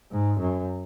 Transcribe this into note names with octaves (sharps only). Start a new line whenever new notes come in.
G#2
F#2